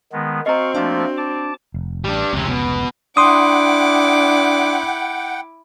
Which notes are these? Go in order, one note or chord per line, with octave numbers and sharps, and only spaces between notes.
D#3 G#3 B3
C4 F#4 D#5 F5 A#5 C#6
F3 A3 A#3 D4
A5 D6
F1
A1 G3 D4
F1 C#2 C3 C#4
B2
D4 E4 F#5 G5 C6 D6 D#6